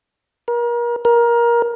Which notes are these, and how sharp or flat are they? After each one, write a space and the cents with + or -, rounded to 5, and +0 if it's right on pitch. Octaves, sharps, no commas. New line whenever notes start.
A#4 +35
A#4 +20